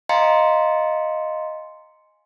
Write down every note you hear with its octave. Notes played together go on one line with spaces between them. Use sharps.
D#5 F5 G#5 A#5 C6 C#7